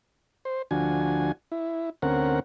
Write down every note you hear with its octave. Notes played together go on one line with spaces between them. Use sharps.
C5
D2 F3 D4 F#4 G#5
E4
D2 C4 C#4 A#4 F#5